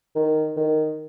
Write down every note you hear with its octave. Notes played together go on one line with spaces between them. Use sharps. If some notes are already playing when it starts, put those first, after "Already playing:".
D#3
D#3